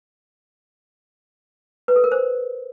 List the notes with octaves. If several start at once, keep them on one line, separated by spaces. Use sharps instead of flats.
B4
A4
A#4
C5